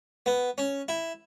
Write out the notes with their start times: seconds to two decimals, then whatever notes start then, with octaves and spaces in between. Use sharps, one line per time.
0.26 B3
0.58 C#4
0.88 E4